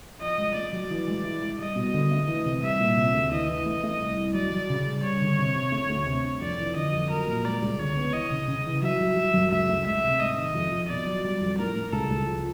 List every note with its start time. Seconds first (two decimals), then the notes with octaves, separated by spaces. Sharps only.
0.21 F3 D#5
0.38 G#3
0.55 A3 D5
0.72 F#3
0.90 E3
1.08 G#3
1.24 E4
1.41 G#3
1.58 G3 D#5
1.76 B2
1.94 D3
2.11 A3
2.28 E3
2.45 C3
2.62 G3 E5
2.80 A#2
2.97 C3
3.14 D2
3.31 E3 D#5
3.49 E3
3.66 A3
3.83 A3
4.00 C2
4.17 C2
4.34 F#3 D5
4.52 F#3
4.70 C#3
4.86 G3
5.03 G3 C#5
5.21 D3
5.39 C3
5.56 C3
5.72 A3
5.89 D2
6.07 C3
6.24 D4
6.41 F2 D5
6.58 E3
6.75 D3 D#5
6.93 F2
7.10 F#3 A#4
7.27 A#2
7.45 G#3 D5
7.62 C#2
7.79 D3 C#5
7.97 B3
8.13 E3 D#5
8.31 C#3
8.48 C#3
8.66 E3
8.82 F#3 E5
9.00 F#3
9.17 F#3
9.34 F#2
9.51 C#2 E5
9.69 A3
9.85 G#3 E5
10.03 C3
10.20 G#2 D#5
10.38 D#3
10.55 F2
10.72 F2
10.89 B2 D5
11.06 F#3
11.24 G3
11.41 F2
11.58 A2 A#4
11.76 A2
11.93 C#2 A4
12.10 C#2
12.27 F3